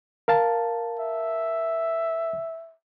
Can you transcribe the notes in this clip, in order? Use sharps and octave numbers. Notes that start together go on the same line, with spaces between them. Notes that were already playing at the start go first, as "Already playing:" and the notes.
A#4 F5 A5
E5